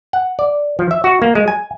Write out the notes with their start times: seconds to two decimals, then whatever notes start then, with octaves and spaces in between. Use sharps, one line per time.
0.13 F#5
0.39 D5
0.79 F3
0.91 E5
1.04 F#4
1.22 A#3
1.35 G#3
1.48 G#5